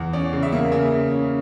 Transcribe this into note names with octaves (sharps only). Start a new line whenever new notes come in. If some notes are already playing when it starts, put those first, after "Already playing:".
Already playing: E2
C#4 D5
C#3
E5
A#3
C#3 E5
C#3
C#4